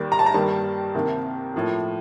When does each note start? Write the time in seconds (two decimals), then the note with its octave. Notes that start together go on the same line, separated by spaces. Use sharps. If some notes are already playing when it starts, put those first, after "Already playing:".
Already playing: D#2 D#3 G3 A#3
0.12 A#5
0.19 A5
0.26 A#5
0.34 G2 D#3 G3 A#3 A5
0.94 C2 C3 D#3 A#3
1.54 A2 F3 A#3